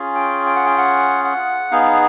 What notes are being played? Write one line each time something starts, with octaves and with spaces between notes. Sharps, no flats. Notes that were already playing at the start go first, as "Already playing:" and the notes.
Already playing: C#4 F4 G#4
G5
G5
F#5
G5
F#5
F#5
B3 D#4 G#4 F5